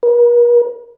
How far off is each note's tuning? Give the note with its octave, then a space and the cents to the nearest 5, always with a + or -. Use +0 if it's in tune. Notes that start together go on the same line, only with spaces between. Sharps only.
A#4 +45